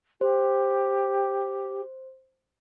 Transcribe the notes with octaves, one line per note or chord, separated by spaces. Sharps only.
G4 C5